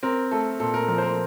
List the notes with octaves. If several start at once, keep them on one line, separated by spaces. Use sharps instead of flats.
C4 A#4
A3 A4
A#2 A4
A#4
F3 A#4
C5
A#4